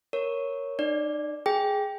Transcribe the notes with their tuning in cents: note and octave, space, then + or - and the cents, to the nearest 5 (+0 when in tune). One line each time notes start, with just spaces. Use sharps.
A#4 +0 C#5 +0
D#4 -40 D5 +0
G#4 +0 G5 +0